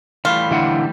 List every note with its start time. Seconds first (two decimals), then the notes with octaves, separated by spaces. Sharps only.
0.25 E3 G3 A3 F4
0.51 D3 E4 F#5